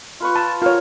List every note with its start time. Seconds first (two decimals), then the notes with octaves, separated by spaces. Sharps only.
0.20 F4 B4 C#6
0.36 A5
0.62 F4 A#4 C#5